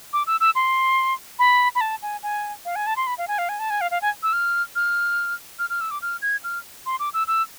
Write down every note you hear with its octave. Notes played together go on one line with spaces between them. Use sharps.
D6
E6
E6
C6
B5
B5
A5
G#5
G#5
F5
G#5
A5
C6
B5
F5
G#5
F5
G#5
A5
G#5
F5
F5
G#5
E6
F6
F6
F6
F6
E6
D6
F6
G#6
F6
C6
D6
E6
E6